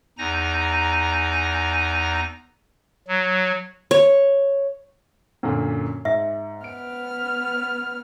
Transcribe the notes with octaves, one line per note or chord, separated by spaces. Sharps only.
E2 D#4 G#5 A#5 A#6
F#3
C#5
F#2 A#2 D3
G#2 E5
B3 F6 D7